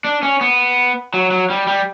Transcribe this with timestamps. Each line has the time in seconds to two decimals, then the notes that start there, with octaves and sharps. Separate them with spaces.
0.05 D4
0.23 C#4
0.41 B3
1.14 F#3
1.31 F#3
1.50 G3
1.67 G3